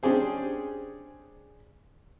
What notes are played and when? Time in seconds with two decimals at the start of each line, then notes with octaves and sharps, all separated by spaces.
0.03 C#4 D4 G4 G#4 C5